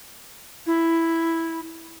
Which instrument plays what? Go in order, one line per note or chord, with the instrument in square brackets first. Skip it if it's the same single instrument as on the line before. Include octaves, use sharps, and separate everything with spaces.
[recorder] E4